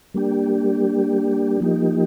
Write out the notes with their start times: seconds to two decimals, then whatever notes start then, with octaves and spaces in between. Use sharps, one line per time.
0.14 G3 A#3 D4 G4
1.60 F3 A#3 D#4 G4